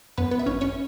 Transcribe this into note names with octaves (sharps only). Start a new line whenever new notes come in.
F#2 B3 B4
B3 B4
E5
G#1 C#4 C#5
C#4 C#5